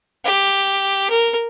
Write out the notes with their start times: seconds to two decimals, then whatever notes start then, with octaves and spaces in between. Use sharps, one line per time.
0.25 G4
1.10 A#4